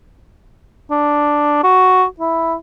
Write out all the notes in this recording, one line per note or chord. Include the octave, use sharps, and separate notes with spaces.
D4
F#4
E4